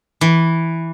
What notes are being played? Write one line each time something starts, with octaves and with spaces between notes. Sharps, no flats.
E3